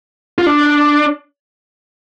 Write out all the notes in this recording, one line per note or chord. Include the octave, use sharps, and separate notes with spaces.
F4
D4